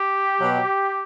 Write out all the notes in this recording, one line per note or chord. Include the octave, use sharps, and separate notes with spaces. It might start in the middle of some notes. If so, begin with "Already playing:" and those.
Already playing: G4
B2 F#3